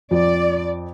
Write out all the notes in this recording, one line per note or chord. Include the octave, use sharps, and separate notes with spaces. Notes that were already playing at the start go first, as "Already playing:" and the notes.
F2 D5